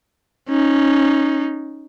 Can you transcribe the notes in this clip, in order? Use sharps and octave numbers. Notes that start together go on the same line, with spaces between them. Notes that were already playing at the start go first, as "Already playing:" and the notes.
C#4 D#4